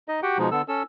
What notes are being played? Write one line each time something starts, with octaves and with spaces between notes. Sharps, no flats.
D#4 D#5
F#4 G4 F#5 G5
B2 F3 G#3 D#4
D3 B3 A4 E6
C#4 A4 E6